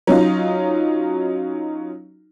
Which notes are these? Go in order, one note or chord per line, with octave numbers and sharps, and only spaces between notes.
F#3 C#4 D#4 F4